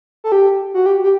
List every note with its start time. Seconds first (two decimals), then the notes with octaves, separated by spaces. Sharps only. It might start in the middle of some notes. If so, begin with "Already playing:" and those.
0.24 A4
0.32 G4
0.74 F#4
0.86 G4
1.03 G4